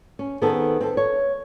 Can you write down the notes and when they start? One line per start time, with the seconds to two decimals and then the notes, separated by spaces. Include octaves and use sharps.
0.19 C#4
0.42 D#3 B3 C4 D#4 G#4 A4
0.81 C4 A4
0.97 C#5